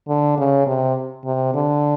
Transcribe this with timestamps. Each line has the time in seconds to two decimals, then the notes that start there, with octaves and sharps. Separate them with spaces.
0.09 D3
0.38 C#3
0.67 C3
1.25 C3
1.54 D3